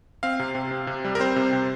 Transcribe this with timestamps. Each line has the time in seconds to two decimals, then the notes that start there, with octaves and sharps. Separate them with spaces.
0.23 C4 F5
0.39 C3
0.55 C3
0.71 C4
0.87 C3
1.04 G3
1.15 A#4
1.20 C4 C5
1.36 C3
1.52 C3